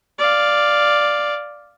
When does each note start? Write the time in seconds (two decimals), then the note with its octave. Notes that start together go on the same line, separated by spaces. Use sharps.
0.19 D5 F5